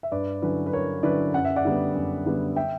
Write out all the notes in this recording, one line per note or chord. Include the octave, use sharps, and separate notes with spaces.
E5
G2 B4 D5
D3 F#3 C#4 E4 B4
B4
G2 A#4 C#5
D3 F#3 C#4 E4 B4 D5
F#2 F#5
E5
D5 F#5
D3 G3 B3
F#2
D3 G3 B3
E5 G5